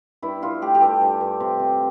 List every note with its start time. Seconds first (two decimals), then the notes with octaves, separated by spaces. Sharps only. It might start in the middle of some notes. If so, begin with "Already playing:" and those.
0.22 G2 E4
0.42 G2 F4
0.62 A3 G4
0.75 G4
0.81 G2 A4
1.02 G2
1.21 G2
1.40 C3
1.60 C3